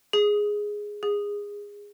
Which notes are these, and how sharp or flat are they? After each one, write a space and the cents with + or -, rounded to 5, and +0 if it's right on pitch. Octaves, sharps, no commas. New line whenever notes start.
G#4 +0
G#4 -20